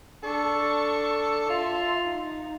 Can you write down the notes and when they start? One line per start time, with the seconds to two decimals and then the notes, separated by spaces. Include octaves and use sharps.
0.23 D4 A4 C#6
1.49 F4 E5 C6
2.02 D#4